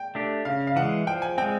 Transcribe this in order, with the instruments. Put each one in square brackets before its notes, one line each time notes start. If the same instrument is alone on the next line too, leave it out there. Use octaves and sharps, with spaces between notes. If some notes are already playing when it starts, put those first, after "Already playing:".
Already playing: [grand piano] G5
[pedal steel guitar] A3 D4 G4
[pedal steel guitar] C#3 [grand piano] F5
[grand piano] F5
[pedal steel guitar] E3 G#3 [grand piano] F#5
[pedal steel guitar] F3 [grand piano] G5
[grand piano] G#5
[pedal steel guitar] G#3 C4 [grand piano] G5